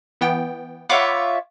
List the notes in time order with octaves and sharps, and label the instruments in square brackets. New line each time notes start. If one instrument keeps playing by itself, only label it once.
[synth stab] E3 B3 G5
[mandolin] F4 C#5 E5 [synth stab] F#5 B5 D6